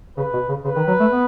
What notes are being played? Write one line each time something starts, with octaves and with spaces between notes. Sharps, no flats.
C#3 B4
B2
C#3
C#3 B4
D#3
F#3
A3
B3